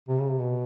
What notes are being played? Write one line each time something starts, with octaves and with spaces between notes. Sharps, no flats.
C3
C#3
C3
B2